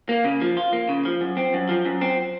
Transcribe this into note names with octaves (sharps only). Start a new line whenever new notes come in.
A#3
C#3
F3
F4
A#3
C#3
F3
F#2
C4
F#2
F3
F#2
C4